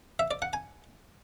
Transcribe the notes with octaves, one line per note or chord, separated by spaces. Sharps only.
E5
D5
F#5
G#5